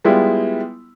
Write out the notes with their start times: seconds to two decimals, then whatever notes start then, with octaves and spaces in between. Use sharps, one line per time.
0.05 G3 G#3 B3 E4 F4